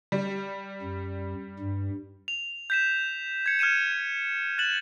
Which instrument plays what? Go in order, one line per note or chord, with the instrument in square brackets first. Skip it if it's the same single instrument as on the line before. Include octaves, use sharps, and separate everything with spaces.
[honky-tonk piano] G3
[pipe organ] F#2
G2
[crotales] F7
G6 B6 E7
G#6 C#7
F6 G#6 C#7 D#7 E7
F#6 A6 E7 F#7